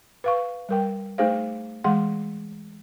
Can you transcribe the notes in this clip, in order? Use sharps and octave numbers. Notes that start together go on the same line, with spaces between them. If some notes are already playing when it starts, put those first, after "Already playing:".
B4 F5 C#6
G3 A#4 G5
A3 D#4 G#4 C5 F5
E3 G#3 G#4 F#5 C6